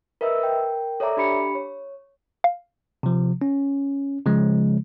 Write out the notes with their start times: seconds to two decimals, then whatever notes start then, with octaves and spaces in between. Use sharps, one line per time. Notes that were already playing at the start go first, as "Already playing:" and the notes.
0.21 A#4 B4 D#5 E5 E6
0.40 A#4 G5
1.00 A4 C#5 D5 E5 A#5 D6
1.17 D4 G4 B5 C#7
1.55 C#5
2.44 F5
3.03 C3 F3
3.41 C#4
4.26 C#3 F3 G#3